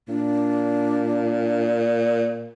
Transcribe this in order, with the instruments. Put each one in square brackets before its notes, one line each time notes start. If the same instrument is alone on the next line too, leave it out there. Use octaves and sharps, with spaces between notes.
[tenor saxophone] A#2 [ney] D4